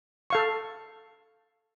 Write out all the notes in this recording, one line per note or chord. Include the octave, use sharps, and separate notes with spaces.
A4 F5 C#6